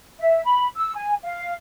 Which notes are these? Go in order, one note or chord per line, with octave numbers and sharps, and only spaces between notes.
E5
B5
E6
G#5
F5